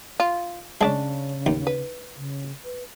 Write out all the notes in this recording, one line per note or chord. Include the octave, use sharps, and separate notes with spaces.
F4
C#3 G#3 C#4 D4 A5
D#2
B4
C#3
B4